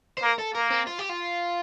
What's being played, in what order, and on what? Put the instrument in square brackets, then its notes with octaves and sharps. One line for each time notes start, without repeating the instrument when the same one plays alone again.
[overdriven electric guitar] C5
[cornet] A#3 [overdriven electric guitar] A#4
[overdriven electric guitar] A4
[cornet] A#3 [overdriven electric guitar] A#4
[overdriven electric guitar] C4
F4
G4
F4